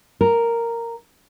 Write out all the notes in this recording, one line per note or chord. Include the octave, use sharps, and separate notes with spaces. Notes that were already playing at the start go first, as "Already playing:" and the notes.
A#4